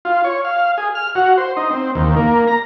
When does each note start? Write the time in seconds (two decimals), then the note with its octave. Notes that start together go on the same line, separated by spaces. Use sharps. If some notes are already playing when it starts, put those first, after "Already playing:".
0.05 F4
0.24 C#5
0.45 F5
0.78 G#4
0.95 F6
1.15 F#4
1.38 C5
1.57 D#4
1.70 C4
1.95 D#2
2.16 A#3
2.48 A#5